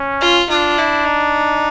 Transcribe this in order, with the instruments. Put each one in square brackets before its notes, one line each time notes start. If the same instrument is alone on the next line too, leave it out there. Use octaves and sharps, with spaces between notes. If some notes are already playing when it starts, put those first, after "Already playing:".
Already playing: [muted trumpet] C#4
[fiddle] F4
[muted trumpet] D4 [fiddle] F4
[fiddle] E4
D#4